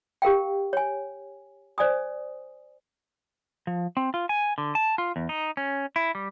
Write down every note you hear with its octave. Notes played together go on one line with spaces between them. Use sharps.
G4 A#4 F5 G5
C#5 G#5
C5 D5 G#5 D#6
F3
C4
F4
G#5
D3
A5
F4
E2
D#4
C#4
E4
G3